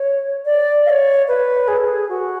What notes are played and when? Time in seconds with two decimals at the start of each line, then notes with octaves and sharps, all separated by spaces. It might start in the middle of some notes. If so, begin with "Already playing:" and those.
Already playing: C#5
0.45 D5
0.86 F5
0.90 C#5
1.28 B4
1.68 G#4
1.77 A4
1.85 G#4
2.09 F#4